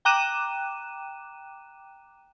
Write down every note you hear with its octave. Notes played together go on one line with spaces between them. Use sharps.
G5 A#5 D6 F#6 D#7 E7